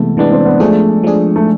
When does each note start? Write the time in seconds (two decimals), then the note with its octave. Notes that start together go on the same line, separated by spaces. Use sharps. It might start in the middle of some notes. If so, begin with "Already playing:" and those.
Already playing: C3 E3 G#3 A3 B3
0.17 C3 E3 G#3 B3 D4
0.32 C4
0.45 B3
0.60 F3 G#3 A3 D4 G#4
1.03 F3 G#3 D4 G#4
1.36 A3